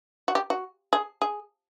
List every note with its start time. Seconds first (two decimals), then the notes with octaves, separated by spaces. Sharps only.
0.28 F#4
0.35 G4
0.50 F#4
0.93 G#4
1.22 G#4